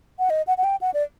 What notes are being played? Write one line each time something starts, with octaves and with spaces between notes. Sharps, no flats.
F#5
D#5
F#5
F#5
G5
F#5
D5